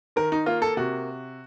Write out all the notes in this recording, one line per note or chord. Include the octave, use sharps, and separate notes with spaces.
D#3 A#4
D#4
A#3 F4
A4
C3 F#4